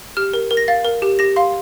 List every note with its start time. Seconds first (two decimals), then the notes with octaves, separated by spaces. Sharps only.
0.17 G4 F6
0.34 A#4
0.51 A#4
0.57 A#6
0.68 F5 A6
0.85 A#4
1.02 G4
1.19 G4 A#6
1.36 F5 C6